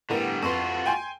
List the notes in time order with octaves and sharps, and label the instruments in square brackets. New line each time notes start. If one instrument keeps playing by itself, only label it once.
[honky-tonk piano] A2 B3 A#4 [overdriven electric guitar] D3 G3
[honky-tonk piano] F2 B4 C6 [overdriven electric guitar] F4 F#4
[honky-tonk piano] G5 G#5 C6